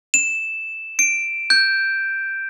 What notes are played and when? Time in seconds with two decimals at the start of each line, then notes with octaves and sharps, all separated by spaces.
0.14 E7
0.99 D7
1.50 G6